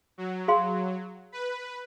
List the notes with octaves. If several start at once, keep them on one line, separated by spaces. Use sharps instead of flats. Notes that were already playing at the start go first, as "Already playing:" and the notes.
F#3
G#4 F5 C6
B4